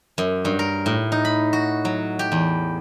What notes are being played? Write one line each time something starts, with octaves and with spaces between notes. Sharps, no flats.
F#2
G2
A#4
A2
D#4
B5
F#4
F#3
G4
E2